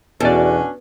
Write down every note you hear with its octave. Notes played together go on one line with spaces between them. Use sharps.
E2 B2 C#4 D4 F#4 A4 D5